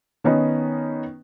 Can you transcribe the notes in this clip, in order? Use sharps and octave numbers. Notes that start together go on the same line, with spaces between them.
D#3 B3 C#4 D#4